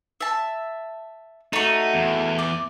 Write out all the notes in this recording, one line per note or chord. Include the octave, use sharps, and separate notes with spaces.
E5 A5
A3 D#4 F#4
E2
D5